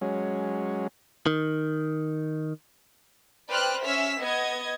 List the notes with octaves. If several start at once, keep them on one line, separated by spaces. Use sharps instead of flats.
F#3 G#3 C#4
D#3
B4 C5 D5 G5 F6 F#6
C#4 E5 E6 F6 B6
B3 D#5 G#6